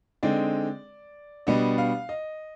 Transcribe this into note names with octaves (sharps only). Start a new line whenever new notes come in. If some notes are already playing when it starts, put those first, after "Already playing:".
D3 G#3 C4 D#4 D5
B2 G3 B3 D4 D#5
F5
D#5